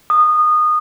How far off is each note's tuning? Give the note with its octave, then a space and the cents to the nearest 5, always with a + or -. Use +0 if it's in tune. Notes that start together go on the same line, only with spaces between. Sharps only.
D#6 -20